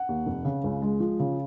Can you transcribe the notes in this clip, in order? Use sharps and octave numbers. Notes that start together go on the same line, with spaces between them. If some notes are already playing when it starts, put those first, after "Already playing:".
Already playing: F#5
D#2
F1
C#3
C#2
G#3
F3
C#3